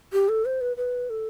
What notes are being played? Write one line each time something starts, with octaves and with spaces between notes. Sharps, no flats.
G4
A4
C5
B4
B4
A4